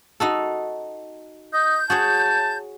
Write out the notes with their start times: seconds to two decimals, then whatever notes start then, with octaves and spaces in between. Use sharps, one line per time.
0.20 D#4 F#4 A4
1.53 D#5 G6
1.90 F#4 G#4 C#5 A5